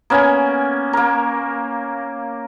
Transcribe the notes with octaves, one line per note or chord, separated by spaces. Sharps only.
A#3 B3 C#4 G#5
A#3 A#4